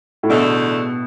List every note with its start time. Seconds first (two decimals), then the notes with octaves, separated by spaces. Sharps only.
0.23 A2
0.29 E2 B2 D3 A3 D4